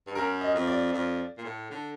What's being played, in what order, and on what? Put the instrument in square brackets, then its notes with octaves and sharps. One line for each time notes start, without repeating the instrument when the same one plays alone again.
[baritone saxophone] G2
[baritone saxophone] F#2 [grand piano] A#4
[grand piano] D#5
[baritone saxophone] F2
[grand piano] D5
[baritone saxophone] F2
A#2
A2
D3